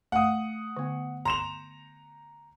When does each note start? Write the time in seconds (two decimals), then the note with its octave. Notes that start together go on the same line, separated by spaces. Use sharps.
0.12 A3 F5 F#5 D#6
0.77 D3 B3
1.25 A#5 C6 E7 F7